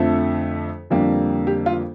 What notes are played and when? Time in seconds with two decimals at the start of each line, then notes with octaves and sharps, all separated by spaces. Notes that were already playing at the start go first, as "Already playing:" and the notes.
Already playing: F2 D3 F3 A3 A4
0.90 F2 D3 G3 A#3
1.47 G4
1.66 F4